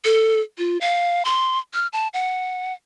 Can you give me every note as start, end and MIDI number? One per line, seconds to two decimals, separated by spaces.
0.05 0.40 69
0.58 0.78 65
0.81 1.23 77
1.25 1.59 84
1.74 1.87 89
1.93 2.08 81
2.14 2.73 78